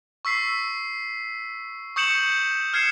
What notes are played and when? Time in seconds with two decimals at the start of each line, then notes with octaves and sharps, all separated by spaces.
0.25 C#6 E6 B6 C7
1.96 C#6 D#6 G6 C#7 E7 F#7
2.73 F6 G#6 C7 C#7 E7